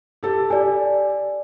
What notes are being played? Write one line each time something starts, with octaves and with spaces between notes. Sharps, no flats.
G4 A4
G4 D5 G#5